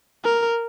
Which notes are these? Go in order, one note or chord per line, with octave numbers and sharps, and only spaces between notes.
A#4